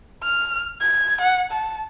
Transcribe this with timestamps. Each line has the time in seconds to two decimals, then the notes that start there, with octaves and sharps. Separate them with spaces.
0.23 F6
0.81 G#6
1.21 F#5
1.51 A5